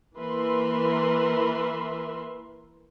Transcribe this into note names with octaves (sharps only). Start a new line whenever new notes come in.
E3 A#3 A#4 B4 E5 C6